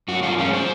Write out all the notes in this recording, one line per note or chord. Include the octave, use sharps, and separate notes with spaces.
F#2 F#4
F#2 F4
G#3 C#4
C5